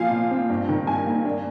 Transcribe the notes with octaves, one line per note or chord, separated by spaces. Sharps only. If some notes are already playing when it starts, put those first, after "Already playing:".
Already playing: A#2 F3 F5 G#5
A#2
C4
G2
D#3
G2 G#5
A#3
D4